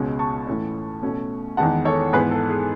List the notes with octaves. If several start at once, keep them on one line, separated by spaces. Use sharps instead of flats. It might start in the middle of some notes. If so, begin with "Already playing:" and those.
Already playing: C#2 B2 G#3 C#4
A5 C#6
A2 E3 A3 C#4
B2 A3 C#4
E2 D#3 G#3 B3 F#5 A5
A4 C#5
G#2 E3 B3 G#4 B4
A4
G#4